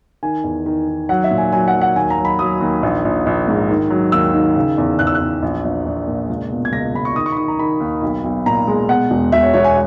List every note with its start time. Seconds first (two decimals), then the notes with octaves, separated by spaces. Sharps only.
0.23 D#3 G#5
0.44 E2
0.66 D#3
0.88 D#3
1.09 F#3 F#5
1.24 E5
1.31 A#2
1.38 G#5
1.53 F#3 G#5
1.68 F#5
1.74 F#3
1.81 F#5
1.96 D#2 G#5
2.10 A#5
2.18 F#3
2.25 B5
2.39 F#3 D#6
2.61 D#2
2.83 A#1
3.05 A#1
3.26 A#1
3.48 G#2
3.69 D#3
3.90 F#3
4.12 D#2 E6
4.34 D#3
4.56 C#3
4.78 E2
4.99 E2 F#6
5.07 E6
5.14 F#6
5.21 E2
5.42 A#1
5.65 A#1
5.86 A#1
6.08 A#2
6.30 C#2
6.51 B2
6.65 G#6
6.72 C#2 A#6
6.94 C#2 B5
7.05 C#6
7.16 D#3 D#6
7.26 C#6
7.32 B5
7.37 D#3 C#6
7.48 A#5
7.59 D#3 B5
7.80 D#2
8.02 B1
8.24 B1
8.46 A#2 A#5
8.67 G#3
8.89 B2 F#5
9.10 E1
9.32 E1 E5
9.43 C#5
9.53 E1 C#5
9.64 G#5